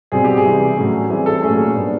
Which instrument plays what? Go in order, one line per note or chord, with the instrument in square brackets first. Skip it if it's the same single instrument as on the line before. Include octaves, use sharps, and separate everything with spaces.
[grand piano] B2 G3 C4 G#4
G4
G#4
C3 E3 G3
A2 F#3 A3 C#4
E3 G3 C4 G#4
A4
A#2 F#3 A3 C#4 G#4
A#2 G3 B3 D4